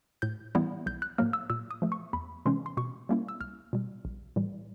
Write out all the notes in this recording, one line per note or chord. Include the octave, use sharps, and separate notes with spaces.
A2 G6
E3 G3 B3 E4
B1 G6
F#6
A2 F#3 A#3 F6
E6
A#2 E6
D#6
F3 A3
C#6
E2 B5
C3 E3 G#3 C#4 C6
C6
B2 C#6
G3 A#3 C#4 E4
E6
C2 F6
B2 G3
A#1
A2 E3 G3